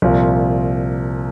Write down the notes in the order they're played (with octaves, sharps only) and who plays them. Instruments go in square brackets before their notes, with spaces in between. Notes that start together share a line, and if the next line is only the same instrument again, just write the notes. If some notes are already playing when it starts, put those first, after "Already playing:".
[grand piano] C2 A#2 F3